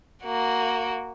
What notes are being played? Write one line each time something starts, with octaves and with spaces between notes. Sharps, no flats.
A#3 F#4